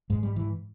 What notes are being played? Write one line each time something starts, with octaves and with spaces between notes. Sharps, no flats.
G#2 G#3
G3
E3